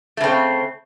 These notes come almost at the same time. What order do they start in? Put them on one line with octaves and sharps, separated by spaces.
A3 C#3 C4